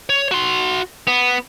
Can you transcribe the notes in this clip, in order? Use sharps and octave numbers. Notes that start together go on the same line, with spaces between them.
C#5
F#4 C6
B3